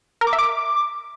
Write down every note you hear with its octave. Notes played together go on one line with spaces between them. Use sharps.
A#4
D6
E5
D6